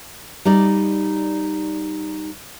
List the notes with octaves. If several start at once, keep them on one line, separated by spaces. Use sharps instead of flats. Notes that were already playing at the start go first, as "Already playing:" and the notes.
G3 D#4 D5